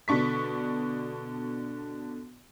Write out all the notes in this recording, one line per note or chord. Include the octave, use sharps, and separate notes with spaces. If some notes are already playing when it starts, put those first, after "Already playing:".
B2 D3 D4 C#6 B6